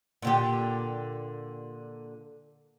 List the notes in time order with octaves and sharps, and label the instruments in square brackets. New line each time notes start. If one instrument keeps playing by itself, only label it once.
[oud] A#2 D3 G4